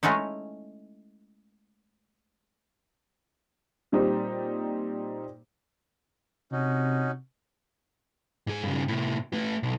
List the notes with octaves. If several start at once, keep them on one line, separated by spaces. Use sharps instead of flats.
G#3 A3 C#4 D#4 E4
A#2 G3 C4 D#4 G4
C3 C#4 D#4 F#4
G#2 G#4
G2 C#3
A2 C3
A3 B4
B1